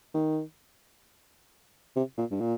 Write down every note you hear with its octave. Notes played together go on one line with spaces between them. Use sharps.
D#3
C3
A#2
G2
A#2